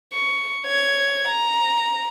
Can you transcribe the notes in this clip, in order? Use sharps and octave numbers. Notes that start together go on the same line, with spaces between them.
C#6
C#5 G#6
A#5